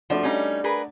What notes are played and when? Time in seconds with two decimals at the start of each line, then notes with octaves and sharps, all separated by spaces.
0.10 F3 A3 D4 F#4
0.23 G3 C#4 D#4
0.64 G#4 A#4 B4